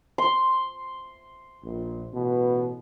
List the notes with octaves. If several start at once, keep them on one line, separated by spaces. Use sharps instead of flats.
C6
A#1
A1 B2 B4